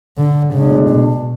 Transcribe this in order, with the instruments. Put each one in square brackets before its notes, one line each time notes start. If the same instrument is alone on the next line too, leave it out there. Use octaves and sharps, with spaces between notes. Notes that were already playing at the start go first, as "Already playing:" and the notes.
[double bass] D3
[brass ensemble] B1 A2 G#3 D4 [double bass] C#3
[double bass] B2